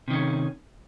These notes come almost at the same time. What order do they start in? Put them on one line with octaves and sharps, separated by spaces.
C3 D#3 C#4